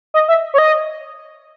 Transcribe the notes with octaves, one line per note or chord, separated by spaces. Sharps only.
D#5
E5
C#5
D#5